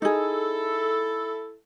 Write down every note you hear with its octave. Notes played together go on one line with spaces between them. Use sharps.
D#4 E4 G#4 A4